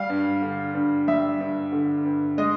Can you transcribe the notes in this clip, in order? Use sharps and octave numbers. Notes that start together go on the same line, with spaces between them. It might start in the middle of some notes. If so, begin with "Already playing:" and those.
Already playing: G3 F5
G2
D3
G2
G3 E5
G2
D3
G2
G#3 D#5